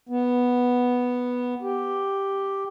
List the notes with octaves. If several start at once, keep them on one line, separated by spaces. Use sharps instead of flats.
B3
G4